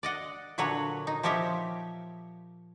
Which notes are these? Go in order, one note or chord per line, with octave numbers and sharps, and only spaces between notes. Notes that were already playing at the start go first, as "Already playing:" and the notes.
D5 D#5 F#5
A#2 D3 F#3 B4 C#5 F#5
D#4
F3 G4 C#5 D#5 E5